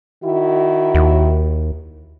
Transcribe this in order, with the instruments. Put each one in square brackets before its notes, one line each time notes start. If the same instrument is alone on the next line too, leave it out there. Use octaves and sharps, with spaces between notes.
[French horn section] D#3 E4 F#4
[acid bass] D#2